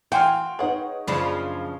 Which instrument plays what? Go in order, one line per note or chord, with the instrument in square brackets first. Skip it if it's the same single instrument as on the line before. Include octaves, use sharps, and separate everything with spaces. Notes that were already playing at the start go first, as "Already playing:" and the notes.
[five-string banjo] E3 G#5 [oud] F#4 [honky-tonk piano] F5 [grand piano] G5 C6 F6
[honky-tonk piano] D#4 B4 C#5 [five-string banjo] G#4 F#5
[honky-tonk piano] F#1 [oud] C#3 F3 D4 [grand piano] B5